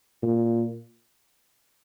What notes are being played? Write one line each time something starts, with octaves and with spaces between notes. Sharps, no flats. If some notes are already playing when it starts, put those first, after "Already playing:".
A#2